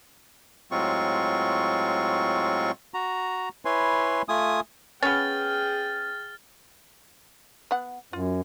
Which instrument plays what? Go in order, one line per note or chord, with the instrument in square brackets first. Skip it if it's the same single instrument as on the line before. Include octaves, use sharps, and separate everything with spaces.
[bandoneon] A2 F#3 G#3 C4 F4 C#6
[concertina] F#4 A#5
E4 B4 C#5 G#5 C6
A3 F4 G#5 D#6
[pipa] B3 C#4 [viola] G#4 G5 [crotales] F6 A6
[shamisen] B3 F#5
[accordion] F#2 [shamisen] F4